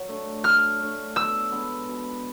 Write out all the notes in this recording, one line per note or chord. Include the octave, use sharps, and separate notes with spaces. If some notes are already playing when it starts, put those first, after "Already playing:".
Already playing: F#3
A3 D4
F#3 F6
A3 D4
B2 E6
G#3 B3 D4
B2